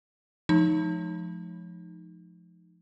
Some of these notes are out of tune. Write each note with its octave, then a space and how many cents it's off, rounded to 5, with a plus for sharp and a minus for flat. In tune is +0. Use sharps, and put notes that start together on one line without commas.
F3 +0 G#3 +40 D#4 +0